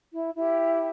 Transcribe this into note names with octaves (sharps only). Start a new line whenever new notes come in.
E4
E4 G4